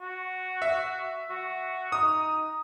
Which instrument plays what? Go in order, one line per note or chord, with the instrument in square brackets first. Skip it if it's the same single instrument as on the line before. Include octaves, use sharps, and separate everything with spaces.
[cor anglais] F#4
[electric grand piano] E5
[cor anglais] F#4
[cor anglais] D#4 [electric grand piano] D#6